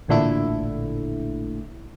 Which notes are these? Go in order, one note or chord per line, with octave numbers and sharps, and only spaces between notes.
A1 A#2 D3 A3 E4